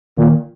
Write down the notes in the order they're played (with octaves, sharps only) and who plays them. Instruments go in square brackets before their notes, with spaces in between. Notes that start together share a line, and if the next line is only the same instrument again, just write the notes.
[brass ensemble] A#2 [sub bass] D#3